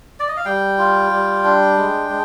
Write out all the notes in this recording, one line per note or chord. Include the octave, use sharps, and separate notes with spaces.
D5
D#5
F5
G3 G5
F4
G3
D4
G#3
G#3